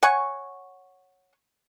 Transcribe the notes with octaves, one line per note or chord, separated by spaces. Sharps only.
C#5 F#5 G#5 C#6